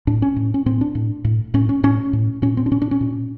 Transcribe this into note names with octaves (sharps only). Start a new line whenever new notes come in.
A2 D4
C#4
A2
C#4
A2 C4
D4
A2
A2
A2 C#4
C#4
A2 C#4
A2
A#2 C#4
C4
D4
A#2 C#4
D4
C#4
A#2